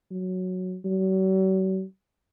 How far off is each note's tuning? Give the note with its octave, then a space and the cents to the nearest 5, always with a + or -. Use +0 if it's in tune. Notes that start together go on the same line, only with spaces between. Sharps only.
F#3 -5
F#3 +40